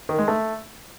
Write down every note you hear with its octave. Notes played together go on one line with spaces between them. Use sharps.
D#3
G#3
A3